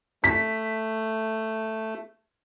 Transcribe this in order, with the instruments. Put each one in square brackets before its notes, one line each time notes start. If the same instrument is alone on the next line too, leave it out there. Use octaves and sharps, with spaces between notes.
[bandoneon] A3 [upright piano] B6